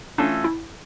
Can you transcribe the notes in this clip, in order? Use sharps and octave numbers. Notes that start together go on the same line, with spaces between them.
E3 A3 C#4 D4 F4 A4
E4